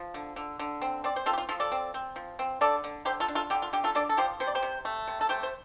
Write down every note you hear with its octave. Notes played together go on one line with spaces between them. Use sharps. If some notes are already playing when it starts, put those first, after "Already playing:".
Already playing: F3
D3
D3
D3
C4
C4 D5
C5
C4 F4 A4
G4
F4
F3 F4 A4
A4 D5
C4
C4
F3
C4
D3 A4 D5
D3
D3 G4 C5
F4 A4
D4
F4 A4
D3 G4
F4
D3 G4
F4 A4
D4 A4 D5
A4
F3 G4 C5
C3 C5
D5
G4 C5
C3
A3
C3
A4
A3 G4 C5
C5